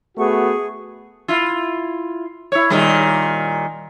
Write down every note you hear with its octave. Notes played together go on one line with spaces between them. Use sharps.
A3 B3 F#4 G#4 C#6
E4 F4
E4 C#5
A#2 D#3 G3